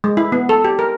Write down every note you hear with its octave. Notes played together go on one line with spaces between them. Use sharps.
G#3
E4
B3
A4
G4
A#4